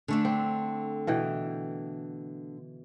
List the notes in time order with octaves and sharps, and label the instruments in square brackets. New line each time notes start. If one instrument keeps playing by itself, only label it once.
[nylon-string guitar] D3 A3 D4
[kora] C4
B2 E3 G5